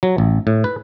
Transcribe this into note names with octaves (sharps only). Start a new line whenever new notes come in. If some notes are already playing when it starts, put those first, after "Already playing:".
F#3
A1
A2
B4